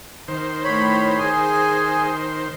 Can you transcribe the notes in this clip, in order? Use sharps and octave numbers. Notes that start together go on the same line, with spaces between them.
D#3 C5
A2 C#5 B5
G#4 G#5